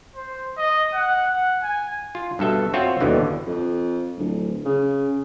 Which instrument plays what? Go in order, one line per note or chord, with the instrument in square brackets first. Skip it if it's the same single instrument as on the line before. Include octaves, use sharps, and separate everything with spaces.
[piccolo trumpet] C5
D#5
F#5
F#5
G#5
[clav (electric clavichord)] F4
G2 B2 A4 E5
C4 F4 F#4 C#5 E5
G1 D#2 B2 D3 E3
[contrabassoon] F2
D1
C#3